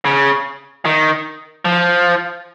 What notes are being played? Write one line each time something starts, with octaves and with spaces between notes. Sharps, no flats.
C#3
D#3
F3